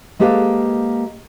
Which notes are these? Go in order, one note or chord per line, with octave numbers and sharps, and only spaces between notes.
G#3 A#3 G4 A4 B4 F5